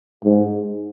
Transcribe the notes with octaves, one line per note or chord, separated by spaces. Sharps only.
G#2